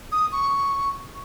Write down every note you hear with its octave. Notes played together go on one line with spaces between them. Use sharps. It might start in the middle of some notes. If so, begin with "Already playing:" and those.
D#6
C#6